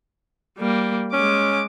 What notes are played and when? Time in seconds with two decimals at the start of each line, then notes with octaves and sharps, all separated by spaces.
0.59 G3 A#3
1.13 G#3 C#4 D6